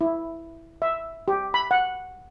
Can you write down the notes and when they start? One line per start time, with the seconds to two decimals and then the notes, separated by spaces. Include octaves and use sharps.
0.01 E4
0.82 E5
1.28 G4
1.54 B5
1.71 F#5